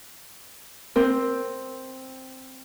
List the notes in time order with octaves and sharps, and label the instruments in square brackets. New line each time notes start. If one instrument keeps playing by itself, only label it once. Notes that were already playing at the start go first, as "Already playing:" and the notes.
[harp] C4 [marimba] A#4